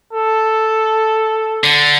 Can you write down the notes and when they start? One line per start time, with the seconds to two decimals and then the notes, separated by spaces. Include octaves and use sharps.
0.13 A4
1.64 D3